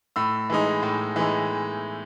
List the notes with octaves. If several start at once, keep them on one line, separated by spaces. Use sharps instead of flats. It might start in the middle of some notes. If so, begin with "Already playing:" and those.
A2 E6
E3 G#3 D#4
A2
E3 G#3 D#4